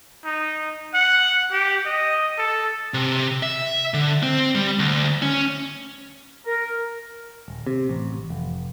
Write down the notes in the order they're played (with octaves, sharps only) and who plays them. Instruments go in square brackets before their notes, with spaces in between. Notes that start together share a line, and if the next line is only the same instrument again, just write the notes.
[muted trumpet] D#4
F#5
G4
D#5
A4
[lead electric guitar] C3
E5
D3
C4
G3
D2
C#4
[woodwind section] A#4
[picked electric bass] D#1
C3
A1
F1